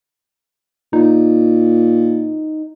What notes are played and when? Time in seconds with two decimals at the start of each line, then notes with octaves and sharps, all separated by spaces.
0.93 A#2 D#4